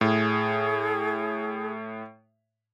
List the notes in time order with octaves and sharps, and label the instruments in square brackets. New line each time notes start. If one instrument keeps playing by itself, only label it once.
[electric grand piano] A2 [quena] G#4